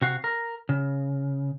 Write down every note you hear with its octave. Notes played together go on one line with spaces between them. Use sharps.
C3 F#4 F5
A#4
C#3